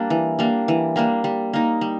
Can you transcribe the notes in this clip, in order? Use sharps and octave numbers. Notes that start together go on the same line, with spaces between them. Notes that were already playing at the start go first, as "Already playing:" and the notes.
Already playing: G3 A#3 D4
E3
G3 A#3 D4
E3
G3 A#3 D4
G3
A#3 D#4
G3